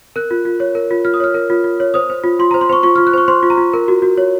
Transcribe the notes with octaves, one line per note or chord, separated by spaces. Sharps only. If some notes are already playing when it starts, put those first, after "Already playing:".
A#4 F#6
F4
F4
C#5
A#4
F4
F4 F6
D#6
C#5 F6
A#4
F4
F4
C#5
C5 D#6
C5
F4
F4 C6
A#5
C5
C6
C5 C#6
F4 C#6
F4 F6
F#6
C5 C#6
C5 C6
F4
A#5
F4
A#4
F#4
F#4
C#5